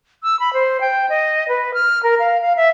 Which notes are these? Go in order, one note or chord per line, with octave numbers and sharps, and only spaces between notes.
E6
B5
C5
G5
D#5
B4
F6
A#4
F5
F5
E5